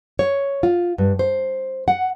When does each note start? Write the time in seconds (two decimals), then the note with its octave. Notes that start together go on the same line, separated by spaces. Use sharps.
0.19 C#5
0.63 F4
0.98 G2
1.19 C5
1.88 F#5